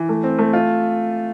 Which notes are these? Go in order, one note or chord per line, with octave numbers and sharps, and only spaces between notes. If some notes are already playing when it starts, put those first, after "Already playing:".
Already playing: E3
A3
C4
A3
F4